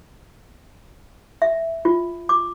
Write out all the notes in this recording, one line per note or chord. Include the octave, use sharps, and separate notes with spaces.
E5
F4
D6